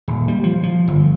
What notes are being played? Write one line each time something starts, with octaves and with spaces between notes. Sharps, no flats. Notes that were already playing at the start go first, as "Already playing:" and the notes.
D#1
G3
F3
F3
G1